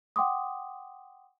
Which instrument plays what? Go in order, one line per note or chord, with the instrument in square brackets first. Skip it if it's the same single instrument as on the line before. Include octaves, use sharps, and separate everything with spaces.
[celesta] F#5 G5 C6 D6 D#6